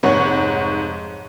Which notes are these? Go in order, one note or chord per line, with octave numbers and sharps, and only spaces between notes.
F1 G#2 C#5 F#5 C#6